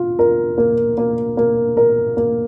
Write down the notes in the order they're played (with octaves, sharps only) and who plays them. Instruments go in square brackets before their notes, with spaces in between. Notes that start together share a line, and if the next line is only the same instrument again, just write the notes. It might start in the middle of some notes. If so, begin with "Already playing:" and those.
Already playing: [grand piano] F4
A#4
A#3
A#3
A#3
A#4
A#3